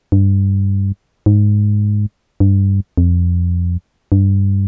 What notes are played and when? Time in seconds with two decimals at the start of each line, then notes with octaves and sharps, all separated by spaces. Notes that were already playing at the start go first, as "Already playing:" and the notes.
0.12 G2
1.26 G#2
2.40 G2
2.98 F2
4.12 G2